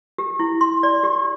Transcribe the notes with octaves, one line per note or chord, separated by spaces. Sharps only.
G4
E4
C6
D5
G4